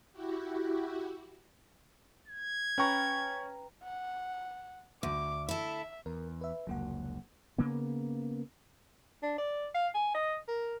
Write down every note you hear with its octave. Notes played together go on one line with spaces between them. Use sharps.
E4 F#4 G4
G#6
C#4 B4 G5 A#5 C#6
F#5
D2 D6
E4 A4 E5
E2 A#4
B4 E5
F1 C#2 F#3 A#3 F#5
C#3 A#3 B3
D4
D5
F5
G#5
D#5
A#4